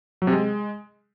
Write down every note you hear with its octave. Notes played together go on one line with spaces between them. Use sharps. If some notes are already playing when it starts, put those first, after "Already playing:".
F#3
C3
G#3